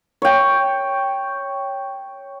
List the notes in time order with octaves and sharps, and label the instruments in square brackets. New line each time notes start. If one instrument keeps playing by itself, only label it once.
[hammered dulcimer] C#5 G5